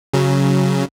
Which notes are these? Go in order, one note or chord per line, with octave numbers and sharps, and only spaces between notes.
C#3 F#3